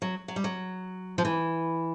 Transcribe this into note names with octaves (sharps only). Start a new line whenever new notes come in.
F#3
F#3
G3
F#3
F3
E3